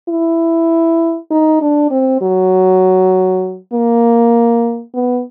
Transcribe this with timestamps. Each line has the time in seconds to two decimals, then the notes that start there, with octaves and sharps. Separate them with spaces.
0.09 E4
1.31 D#4
1.61 D4
1.91 C4
2.21 F#3
3.73 A#3
4.94 B3